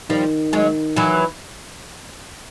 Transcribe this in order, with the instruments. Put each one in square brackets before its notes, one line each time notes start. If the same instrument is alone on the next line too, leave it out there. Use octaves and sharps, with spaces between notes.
[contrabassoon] D#3 [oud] F3 G3
[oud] F#3 G#3
E3 F#3